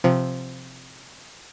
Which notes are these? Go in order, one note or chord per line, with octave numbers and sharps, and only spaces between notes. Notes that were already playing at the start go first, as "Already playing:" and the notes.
C3 F3